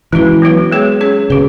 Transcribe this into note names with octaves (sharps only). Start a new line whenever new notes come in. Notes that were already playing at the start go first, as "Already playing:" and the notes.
E3 G#3 C#4 F#4 B4
F#3 B3 F#4 B4
G#3 B3 G#4 C#5
C#4 G#4 C#5
C#3 F#4 B4